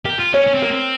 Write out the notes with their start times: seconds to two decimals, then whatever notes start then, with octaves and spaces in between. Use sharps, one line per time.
0.05 G4 A#4
0.19 F4
0.33 C#4 C#5
0.47 C#4
0.54 C4
0.62 A#3 A#4
0.70 C4